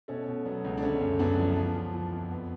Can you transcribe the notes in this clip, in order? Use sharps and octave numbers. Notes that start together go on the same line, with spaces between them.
B2 A3 C#4
B2
F#3 B3
C#2
D4
D3 A3 C#4
F#2
F#2 B3 D4
F3
F3
F3
F3
F2
B3